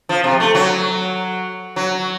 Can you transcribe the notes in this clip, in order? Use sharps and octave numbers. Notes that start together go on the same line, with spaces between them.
F3
C3
A3
F#3
F#3